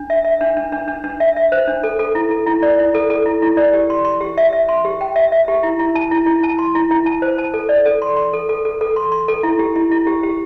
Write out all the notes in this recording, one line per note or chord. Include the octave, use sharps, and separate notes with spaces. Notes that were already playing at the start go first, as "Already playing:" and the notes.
Already playing: D4
E5
E5
D4
D4
D4
D4
D4
E5
E5
C5
D4
A4
A4
E4
A4
E4
D5
E4
A4
A4
E4
E4
D5
G4
C6
C6
G4
E5
E5
C6
G4
G5
E5
E5
G4
E4
E4
A5
E4
E4
A5
C6
E4
E4
A5
C5
A5
A4
D5
A4
C6
C6
A4
A4
A4
A4
C6
C6
A4
E4
G4
E4
E4
G4
G4